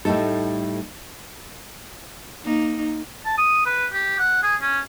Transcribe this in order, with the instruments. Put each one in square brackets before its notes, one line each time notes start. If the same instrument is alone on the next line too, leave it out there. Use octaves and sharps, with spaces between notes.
[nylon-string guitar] A2 G3 A3 D#4 A4
[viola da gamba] A#3 D#4
[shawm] A5
D#6
B4
G4
F#5
G#4
C#4